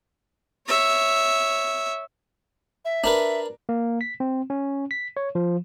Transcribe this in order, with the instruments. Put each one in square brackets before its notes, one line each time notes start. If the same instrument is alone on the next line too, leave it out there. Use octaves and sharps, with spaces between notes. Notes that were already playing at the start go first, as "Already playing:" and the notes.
[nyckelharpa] C#5 E5
[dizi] E5
[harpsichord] D4 A#4 B4
[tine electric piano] A#3
B6
C4
C#4
B6
C#5
F3